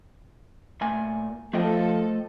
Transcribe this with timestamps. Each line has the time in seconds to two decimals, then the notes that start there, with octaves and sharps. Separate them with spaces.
0.81 A#2 A3 G#5
1.53 F3 A3 A4 D#5 G5